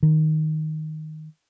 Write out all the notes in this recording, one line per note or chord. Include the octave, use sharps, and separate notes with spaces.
D#3